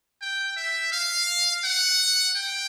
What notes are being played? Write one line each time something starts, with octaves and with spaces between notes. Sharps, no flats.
G5
E5
F5
F#5
G5